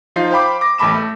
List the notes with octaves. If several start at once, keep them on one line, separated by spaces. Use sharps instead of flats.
F3 D#4 F4 C7
C5 F5 G5 B5 D6
D6 A#6
A1 A3 A5 B5 D6 E7
A3